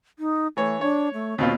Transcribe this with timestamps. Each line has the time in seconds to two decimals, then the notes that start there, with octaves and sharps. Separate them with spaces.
0.19 D#4
0.57 E3 A3 C#5
0.81 D4 C#5
1.14 A3
1.38 D#2 B2 C4 F4